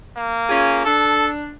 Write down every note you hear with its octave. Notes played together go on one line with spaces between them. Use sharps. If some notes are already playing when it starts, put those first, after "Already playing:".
A#3
C#4 F4 G#4
D4 A4